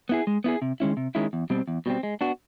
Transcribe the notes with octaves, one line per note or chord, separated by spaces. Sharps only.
B3 E4 G#4
G#3
B3 E4 G#4
C3
D#3 G#3 C#4 E4
C3
D#3 G#3 C#4 E4
E2
B2 G3 C4
E2
B2 G3 C4
G#3
B3 D4 F#4